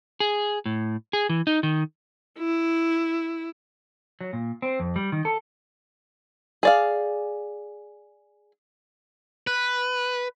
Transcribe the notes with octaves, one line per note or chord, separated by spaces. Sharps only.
G#4
A2
G#4
E3
D#4
D#3
E4
F#3
A#2
C4
F2
G3
D#3
A4
G#4 D5 F5
B4